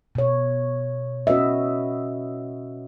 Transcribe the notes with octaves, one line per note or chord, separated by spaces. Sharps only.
B2 C#5
C#4 F#4 B4 D#5 E5